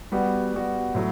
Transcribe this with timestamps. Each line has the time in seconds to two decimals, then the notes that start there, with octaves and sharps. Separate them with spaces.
0.12 G3 B3 F#4
0.53 G3 B3 F#4
0.95 A2 F#3